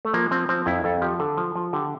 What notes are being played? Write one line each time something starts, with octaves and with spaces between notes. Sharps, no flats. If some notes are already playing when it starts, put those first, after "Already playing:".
A3
F3 A#3
F3 C4
F3 C4
F2 E4
F2 A4
F3 G4
D3 A4
F3
F3
D3 G4